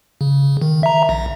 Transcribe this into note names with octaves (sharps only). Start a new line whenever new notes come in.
C#3
D#3
E5 A#5
A#1